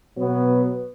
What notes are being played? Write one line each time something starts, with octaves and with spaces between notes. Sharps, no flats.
B2 F#3 B3